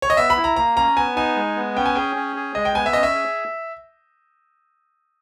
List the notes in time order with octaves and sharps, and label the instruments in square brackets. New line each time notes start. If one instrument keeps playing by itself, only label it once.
[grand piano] C#5
D#5
[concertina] B3 [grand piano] E5
[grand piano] B5
[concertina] E4
[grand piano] A#5
[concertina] A#3 [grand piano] A#5
[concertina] C#4 [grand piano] A#5
[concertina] B3 [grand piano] G#5
[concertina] D#4 [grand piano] G#5
[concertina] G#3
B3
[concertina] C#4 [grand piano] G5
[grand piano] G#5
[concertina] G#4 [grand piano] G5
[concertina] C#4
G#4
[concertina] G#3 [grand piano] D#5
[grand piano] G5
[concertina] B3 [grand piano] G#5
[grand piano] E5
[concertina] C#4 [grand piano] D#5
[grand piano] E5
[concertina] G#4